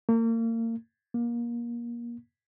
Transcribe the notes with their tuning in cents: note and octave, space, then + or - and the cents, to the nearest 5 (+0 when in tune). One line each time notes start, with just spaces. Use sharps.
A#3 -35
A#3 +25